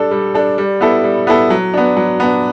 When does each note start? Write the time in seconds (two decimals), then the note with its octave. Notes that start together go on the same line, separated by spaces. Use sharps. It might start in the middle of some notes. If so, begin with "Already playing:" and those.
Already playing: G3 D4 A4
0.11 G3
0.35 D4 A4
0.58 G3
0.81 B3 E4 A4
1.04 G3
1.27 B3 E4 A4
1.50 F#3
1.74 B3 D4
1.97 F#3
2.20 B3 D4